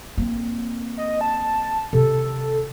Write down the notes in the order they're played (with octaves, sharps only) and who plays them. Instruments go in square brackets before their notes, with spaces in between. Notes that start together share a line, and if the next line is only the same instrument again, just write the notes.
[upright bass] A#3 C4
[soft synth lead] D#5
A5
[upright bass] C3 D#3 [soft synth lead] A4